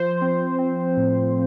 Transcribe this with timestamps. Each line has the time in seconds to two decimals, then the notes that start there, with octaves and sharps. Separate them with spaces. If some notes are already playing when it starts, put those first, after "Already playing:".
Already playing: F3 C5
0.21 C4
0.58 C4
0.97 A2